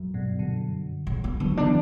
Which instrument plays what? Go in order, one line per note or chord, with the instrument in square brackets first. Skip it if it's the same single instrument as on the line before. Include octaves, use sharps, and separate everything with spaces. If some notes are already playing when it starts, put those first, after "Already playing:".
Already playing: [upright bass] F#2
[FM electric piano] G2 B2
B2 D3
[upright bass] C#3
B3
[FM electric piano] D3 F#3 [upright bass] B3
[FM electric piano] C#3 E3 [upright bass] D4